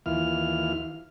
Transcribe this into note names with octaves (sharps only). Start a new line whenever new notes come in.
D#2 E3 E4 F4 F6